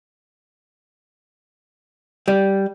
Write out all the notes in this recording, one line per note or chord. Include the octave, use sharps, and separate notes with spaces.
G3